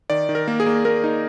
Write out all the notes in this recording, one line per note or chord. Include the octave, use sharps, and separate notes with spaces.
D#3 D5
D#3
A#4
A#3
G#4
A#3
A#3 A#4
D#4